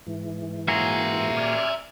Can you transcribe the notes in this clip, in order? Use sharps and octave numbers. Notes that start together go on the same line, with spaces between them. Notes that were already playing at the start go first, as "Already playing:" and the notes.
G#2 E3
A#3 F#4 G#4 E5 A#5
D5 G#5 F6